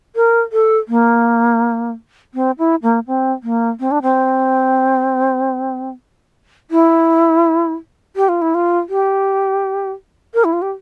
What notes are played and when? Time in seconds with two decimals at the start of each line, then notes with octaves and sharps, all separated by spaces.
0.16 A#4
0.52 A4
0.88 A#3
2.34 C4
2.58 E4
2.83 A#3
3.07 C4
3.43 A#3
3.80 C4
3.91 D4
4.02 C4
6.71 E4
8.16 G4
8.29 F4
8.42 E4
8.55 F4
8.89 G4
10.34 A#4
10.44 E4
10.53 F4
10.62 G4